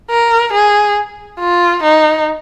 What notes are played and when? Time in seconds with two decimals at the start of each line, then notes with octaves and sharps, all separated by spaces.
0.10 A#4
0.53 G#4
1.40 F4
1.83 D#4